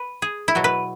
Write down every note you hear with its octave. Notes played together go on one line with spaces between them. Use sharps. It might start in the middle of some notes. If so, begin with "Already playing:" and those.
Already playing: B4
G#4
E4
B2 F#3 F#4
B4